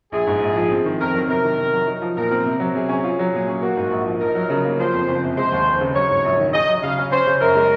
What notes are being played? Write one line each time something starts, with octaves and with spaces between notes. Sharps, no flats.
A#1 G#4
G#2
A#1
F3
C4
D#3
F2 A#4
F#3
C3 A#4
D#3
C3
F#3
D#4
F3
A#2 A#4
C4
C3
F#3
C3 G#4
C#4
F4
F#3
A#2 G#4
C#4
A#3 F#4
G#2
A#1
F3
D#4 A#4
F#3
C#3
A#3
F3 C5
F2
F#1
C3
G#3 C5
D#2
F1
C#3
F#3 C#5
G#2
A#1
D#3
G#4 D#5
F#3
C#3 F5
C#4
C#4 C5
C#3
F#2 A#4
G#3